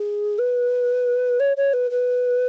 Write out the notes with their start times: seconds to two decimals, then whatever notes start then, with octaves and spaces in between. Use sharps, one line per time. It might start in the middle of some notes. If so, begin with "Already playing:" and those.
Already playing: G#4
0.38 B4
1.40 C#5
1.57 C#5
1.73 B4
1.91 B4